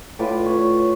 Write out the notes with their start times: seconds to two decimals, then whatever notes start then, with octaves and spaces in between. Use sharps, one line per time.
0.19 A2 F4 B4 D6
0.46 B4 C#5